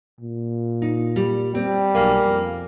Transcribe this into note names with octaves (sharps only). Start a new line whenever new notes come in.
A#2
D#4
G3
G3 C4
B1 A#3 G#5
F2